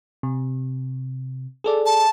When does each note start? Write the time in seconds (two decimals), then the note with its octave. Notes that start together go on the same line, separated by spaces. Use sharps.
0.23 C3
1.64 G#4 A4 D5
1.86 A5